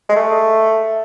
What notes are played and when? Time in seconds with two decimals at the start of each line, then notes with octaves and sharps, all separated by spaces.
0.09 G#3
0.16 A3